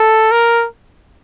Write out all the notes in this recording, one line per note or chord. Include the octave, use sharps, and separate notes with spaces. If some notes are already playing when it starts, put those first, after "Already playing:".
Already playing: A4
A#4